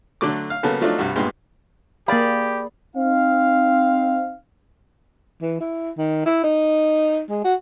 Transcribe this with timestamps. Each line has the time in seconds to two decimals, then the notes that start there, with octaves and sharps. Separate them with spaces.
0.21 D3 F#3 A3 D6
0.50 F5
0.63 C#3 F#3 A#3 B3 A4
0.81 F3 F#3 A3 D4 D#4 F4
0.98 C2 G2 F#4
1.16 G2 A#2 G#3 B3 G4 C6
2.08 A#3 G4 G#4 D5 F5 B5
2.96 C4 D#4 F5
5.42 E3
5.60 E4
5.97 D#3
6.26 E4
6.43 D#4
7.29 G#3
7.44 F#4